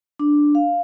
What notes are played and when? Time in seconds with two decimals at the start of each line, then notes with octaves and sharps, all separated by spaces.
0.19 D4
0.55 F5